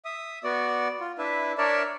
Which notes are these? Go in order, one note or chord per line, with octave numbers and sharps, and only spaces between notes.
E5 D#6
B3 F#4 D5
F4
D4 E4 B4 E5
D4 A#4 C#5 D5 E5 A5